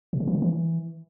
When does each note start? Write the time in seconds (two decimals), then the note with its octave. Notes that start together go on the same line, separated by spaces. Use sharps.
0.13 B2
0.20 C#3
0.28 E3
0.35 D3
0.42 E3